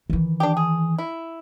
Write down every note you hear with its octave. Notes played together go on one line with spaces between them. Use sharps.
D#3 E3
D4 G4
G#4
E4